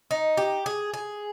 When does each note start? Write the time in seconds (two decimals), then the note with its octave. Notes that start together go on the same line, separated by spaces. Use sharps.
0.11 D#4
0.37 G4
0.66 G#4
0.94 G#4